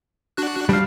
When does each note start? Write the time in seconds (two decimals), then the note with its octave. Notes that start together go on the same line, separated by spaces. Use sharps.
0.37 D4 F#4 F#6
0.69 F3 G3 D4 F5